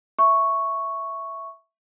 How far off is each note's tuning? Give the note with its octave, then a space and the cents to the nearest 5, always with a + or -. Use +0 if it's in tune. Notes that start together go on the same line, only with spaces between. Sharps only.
E5 +0 C#6 +0